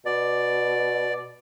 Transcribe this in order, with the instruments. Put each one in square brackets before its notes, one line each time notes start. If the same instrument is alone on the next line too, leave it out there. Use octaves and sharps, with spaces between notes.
[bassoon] B2 [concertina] D5